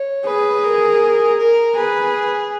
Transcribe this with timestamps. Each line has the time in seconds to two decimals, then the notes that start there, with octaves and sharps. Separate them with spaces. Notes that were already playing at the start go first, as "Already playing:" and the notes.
Already playing: C#5
0.26 G#4 B4
0.64 A#4
1.38 A#4
1.76 G#4 B4